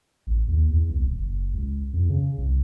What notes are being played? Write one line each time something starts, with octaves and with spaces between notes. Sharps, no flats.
A1
D#2
E2
C2
D#1
F#1
C#2
F2
C#3
C2